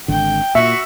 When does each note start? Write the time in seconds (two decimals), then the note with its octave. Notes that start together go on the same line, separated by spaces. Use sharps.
0.08 G#1 D3 G5
0.55 A#2 F#4 E5